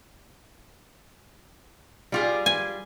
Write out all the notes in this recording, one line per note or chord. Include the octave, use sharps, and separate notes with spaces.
G3 F4 G#4
G#5